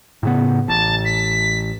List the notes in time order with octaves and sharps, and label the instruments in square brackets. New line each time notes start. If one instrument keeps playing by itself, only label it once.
[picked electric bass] A2 C#3 B3
[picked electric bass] A1 [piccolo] A5
[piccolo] B6